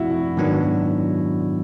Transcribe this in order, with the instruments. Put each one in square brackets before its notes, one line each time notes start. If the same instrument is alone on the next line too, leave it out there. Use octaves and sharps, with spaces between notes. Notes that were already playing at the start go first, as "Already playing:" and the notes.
Already playing: [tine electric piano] F3 A3 C4 [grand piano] E4 F#4
[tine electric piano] G#2 D#3 F#3 B3 D4